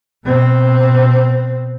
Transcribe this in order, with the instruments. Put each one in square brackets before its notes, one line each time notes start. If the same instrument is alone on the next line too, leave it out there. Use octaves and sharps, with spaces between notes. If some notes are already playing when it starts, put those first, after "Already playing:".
[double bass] B2 C4